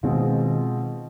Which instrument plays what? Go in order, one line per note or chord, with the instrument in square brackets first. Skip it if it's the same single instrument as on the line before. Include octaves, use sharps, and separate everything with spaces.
[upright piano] B2 G#3 C4 F4 [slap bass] D#3